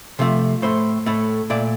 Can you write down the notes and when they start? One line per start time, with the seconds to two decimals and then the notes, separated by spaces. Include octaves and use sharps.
0.19 C3 F3 A3
0.62 A2 A3 C5
1.06 A2 A3
1.50 A#2 A3 D5